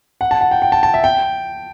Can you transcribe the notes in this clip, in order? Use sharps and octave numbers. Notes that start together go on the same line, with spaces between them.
F#5
A5
F#5
G5
G5
A5
A5
E5
G5